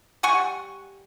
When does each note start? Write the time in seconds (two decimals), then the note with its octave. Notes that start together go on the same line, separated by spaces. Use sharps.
0.23 G3 F#5 G#5 C#6